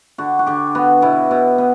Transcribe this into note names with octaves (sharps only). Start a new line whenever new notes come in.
D3 F#4
F#4
D3 G4
B3 F#4
B2 E4
B2
B3